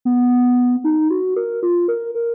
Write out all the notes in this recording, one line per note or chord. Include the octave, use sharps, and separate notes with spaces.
B3
D#4
F#4
A#4
F4
A#4
A#4